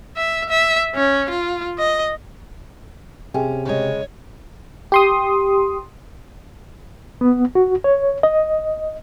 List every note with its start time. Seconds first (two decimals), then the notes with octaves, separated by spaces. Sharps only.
0.17 E5
0.50 E5
0.95 C#4
1.30 F4
1.79 D#5
3.34 C3 C#4 G#4 G5 G#5
3.65 C#3 G#3 C#5
4.92 G4 C6 D#6
7.21 B3
7.55 F#4
7.84 C#5
8.23 D#5